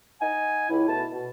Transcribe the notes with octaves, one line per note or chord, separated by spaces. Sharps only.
D#4 F#5 G#5
C#2 E4
B2 A3 A5
B2